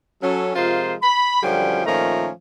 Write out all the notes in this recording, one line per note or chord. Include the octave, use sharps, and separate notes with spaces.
F#3 C#4 A4
C3 F3 G#3 F4 A#4 C5
B5
F#2 D3 F3 G3 C#4 G5
A#2 D#3 F3 A3 C#4 A#5